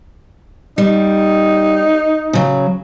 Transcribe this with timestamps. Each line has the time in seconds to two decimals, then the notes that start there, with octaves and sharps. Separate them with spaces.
0.78 G3 D#4
2.33 C#3 F#3